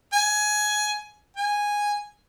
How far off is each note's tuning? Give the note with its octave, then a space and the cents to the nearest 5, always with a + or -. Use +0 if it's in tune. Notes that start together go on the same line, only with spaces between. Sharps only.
G#5 +15
G#5 -10